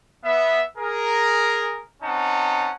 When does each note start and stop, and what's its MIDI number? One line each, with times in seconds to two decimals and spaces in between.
0.24 0.61 59
0.24 0.61 76
0.78 1.81 68
0.78 1.81 70
2.02 2.71 60
2.02 2.71 61
2.02 2.71 63
2.02 2.71 78
2.02 2.71 81